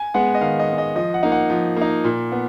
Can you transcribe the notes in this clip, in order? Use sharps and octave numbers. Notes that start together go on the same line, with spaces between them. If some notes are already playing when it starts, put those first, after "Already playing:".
Already playing: G#5
G#3 B3 F#5
D#5
D#3 F5
D#5
G#3 B3
D#5
F3 D#5
F#5
A#3 D#4
F#5
F3
A#3 D#4
A#2
B3